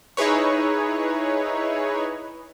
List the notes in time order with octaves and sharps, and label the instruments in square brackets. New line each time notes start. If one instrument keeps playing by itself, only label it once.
[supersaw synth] D#4 E4 G#4 B4 C#5